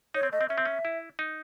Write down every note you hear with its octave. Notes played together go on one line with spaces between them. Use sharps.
D#4 C#5
C4
A3 D#5
C4
C#4 E5
C4
C#4
E4
D#4